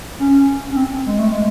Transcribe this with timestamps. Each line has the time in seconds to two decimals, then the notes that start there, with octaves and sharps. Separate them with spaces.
0.19 C#4
0.71 C#4
0.77 C4
1.06 G#3
1.19 A3
1.32 G#3